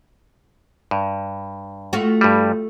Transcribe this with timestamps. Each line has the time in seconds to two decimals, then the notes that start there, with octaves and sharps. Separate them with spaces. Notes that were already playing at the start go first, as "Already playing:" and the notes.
0.91 G2
1.93 A3 F4 F#4
2.21 G2 G3